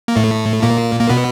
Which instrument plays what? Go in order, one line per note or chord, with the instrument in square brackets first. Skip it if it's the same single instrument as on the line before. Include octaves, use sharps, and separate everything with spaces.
[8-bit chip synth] A#3
A2 A3
A#2 A#3
A#3
B2 B3